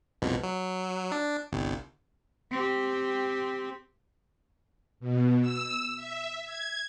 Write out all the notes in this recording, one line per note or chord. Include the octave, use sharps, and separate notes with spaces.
C2 F2 B2
F#3
D4
G1 C2
C4 G4
B2
E6
E5
G#6